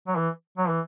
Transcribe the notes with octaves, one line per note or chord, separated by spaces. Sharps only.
F#3
E3
F#3
E3